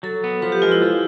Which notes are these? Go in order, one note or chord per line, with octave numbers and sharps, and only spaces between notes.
F#3 A4
B3
F3 B4
G4
G#3 F4
E4
F3